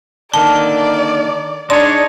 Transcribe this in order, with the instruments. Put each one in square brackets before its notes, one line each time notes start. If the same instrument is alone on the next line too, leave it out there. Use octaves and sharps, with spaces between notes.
[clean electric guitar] D3 D#3 A#3 [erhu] D5 [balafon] A5
[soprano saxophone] D4 [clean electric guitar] D#4 G#4 C#5 [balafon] C6